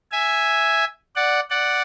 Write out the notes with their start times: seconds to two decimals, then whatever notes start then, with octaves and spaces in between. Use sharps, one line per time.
0.12 E5 G#5
1.16 D5 F#5
1.50 D5 F#5